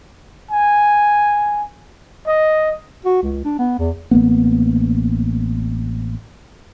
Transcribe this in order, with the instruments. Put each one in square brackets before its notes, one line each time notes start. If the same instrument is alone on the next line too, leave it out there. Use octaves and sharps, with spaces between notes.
[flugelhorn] G#5
D#5
[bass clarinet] F#4
C#2
D4
B3
E2
[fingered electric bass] A1 A#3 B3